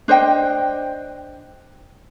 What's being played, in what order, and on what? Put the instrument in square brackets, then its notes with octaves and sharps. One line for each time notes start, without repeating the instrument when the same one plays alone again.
[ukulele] D4 C5 D#5 G5